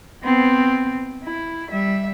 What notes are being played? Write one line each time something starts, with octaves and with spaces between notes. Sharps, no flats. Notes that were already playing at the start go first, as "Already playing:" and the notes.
B3 C4
E4
G3 E5